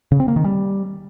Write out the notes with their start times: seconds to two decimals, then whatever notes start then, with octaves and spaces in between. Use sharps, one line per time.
0.12 C#3
0.20 C4
0.28 A#3
0.36 D#3
0.44 G3